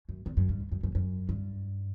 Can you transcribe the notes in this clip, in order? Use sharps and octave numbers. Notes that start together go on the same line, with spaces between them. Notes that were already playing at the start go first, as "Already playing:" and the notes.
F#2
E2
F#2
G2
F#2
F#2
F#2
F#2
G2